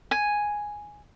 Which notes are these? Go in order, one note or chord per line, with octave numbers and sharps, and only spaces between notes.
G#5